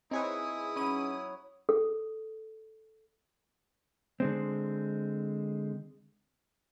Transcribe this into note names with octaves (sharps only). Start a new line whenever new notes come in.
C4 D#4 E4 G#4 B4 C#5 G#5 D#6
F#3 C#4 B5 D#7
A4
D3 G#3 C4